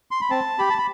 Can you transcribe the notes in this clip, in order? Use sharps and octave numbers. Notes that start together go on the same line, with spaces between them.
C6
B5
C4 A5
G4 B5
A5
B5